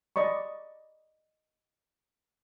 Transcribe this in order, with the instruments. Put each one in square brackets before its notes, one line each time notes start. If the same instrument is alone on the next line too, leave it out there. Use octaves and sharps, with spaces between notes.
[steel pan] D5 D#5 B5 C#6